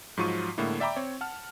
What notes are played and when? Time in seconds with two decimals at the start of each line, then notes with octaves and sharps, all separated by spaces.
0.17 G#2 F3 F#3 F4 C#6 D#7
0.58 A2 D3 G#3 A#3 E4
0.80 D5 E5 G5 A#5 B5 D6
0.96 C4 C#5
1.21 F#5 A5 F6